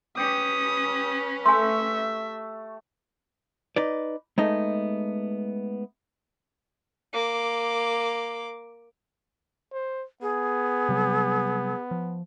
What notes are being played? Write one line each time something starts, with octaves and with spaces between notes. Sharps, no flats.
C#4 G4 B4 D#6
A3 E5 G#5 C6
D#4 B4 D5
G#3 A3 B3 D#4
A#3 D6
C5
B3 G#4
C3 F#3 G3
F3